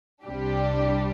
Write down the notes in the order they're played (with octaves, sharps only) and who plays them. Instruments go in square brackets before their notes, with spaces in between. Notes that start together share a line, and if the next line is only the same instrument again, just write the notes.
[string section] C2 C3 G3 D4 G4